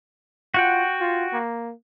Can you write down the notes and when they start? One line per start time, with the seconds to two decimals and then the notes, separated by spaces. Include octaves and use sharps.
0.54 F4 F#4 F#5 G5
1.01 F4
1.33 A#3